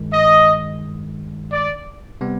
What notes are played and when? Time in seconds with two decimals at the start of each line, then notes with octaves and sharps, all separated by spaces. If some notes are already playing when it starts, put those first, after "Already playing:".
Already playing: G2 D#3 G#3
0.12 D#5
1.52 D5
2.21 C3 G3 B3